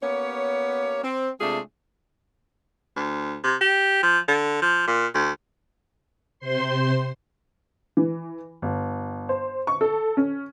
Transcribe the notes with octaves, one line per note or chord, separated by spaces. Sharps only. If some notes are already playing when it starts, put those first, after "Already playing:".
A#3 B3 C#4 G4 C#5
C4
C3 G#3 A3 D4 F4 G#4
D2
C3
G4
F3
D3
F3
A#2
D2
C3 C5 C6
E3
G1
C5
C#6
A4
C#4